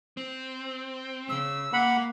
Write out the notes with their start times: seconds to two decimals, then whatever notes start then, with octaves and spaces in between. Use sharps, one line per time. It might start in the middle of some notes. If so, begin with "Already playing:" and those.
0.17 C4
1.29 C#3 E6
1.73 A#3 F#5 B5